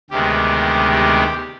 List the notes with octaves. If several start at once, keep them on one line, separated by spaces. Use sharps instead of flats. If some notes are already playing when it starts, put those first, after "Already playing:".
D2 C3 D#3 G#3 B3 G4
G4